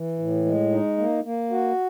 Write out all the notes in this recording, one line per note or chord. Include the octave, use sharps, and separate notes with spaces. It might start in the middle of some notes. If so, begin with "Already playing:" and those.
Already playing: E3
A2
G#3
D#4
A#3
A#3
F#4